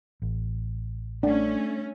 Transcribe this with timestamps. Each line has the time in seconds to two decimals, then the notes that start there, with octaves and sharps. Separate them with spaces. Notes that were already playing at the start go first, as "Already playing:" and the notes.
0.22 A1
1.23 A3 C#4 D4